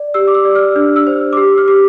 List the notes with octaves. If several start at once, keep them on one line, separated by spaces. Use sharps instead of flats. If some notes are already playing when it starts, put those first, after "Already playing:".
Already playing: D5
G4 E6
D6
E6
D5
F6
D4 F6
E6
C5
D6
G4 E6
F6
G4 D6